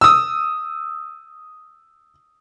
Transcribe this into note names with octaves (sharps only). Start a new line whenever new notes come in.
D#6 E6